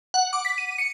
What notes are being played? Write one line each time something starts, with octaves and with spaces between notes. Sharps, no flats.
F#5
D6
B6
D#7
C#7